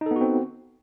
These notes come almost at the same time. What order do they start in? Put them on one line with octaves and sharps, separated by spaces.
D#4 A4 B3 F#4 C4